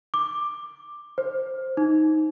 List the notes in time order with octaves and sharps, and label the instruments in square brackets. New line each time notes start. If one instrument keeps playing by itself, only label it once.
[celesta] D6
C5
D#4